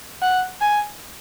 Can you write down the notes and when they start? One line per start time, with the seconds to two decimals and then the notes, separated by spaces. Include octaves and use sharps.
0.22 F#5
0.61 G#5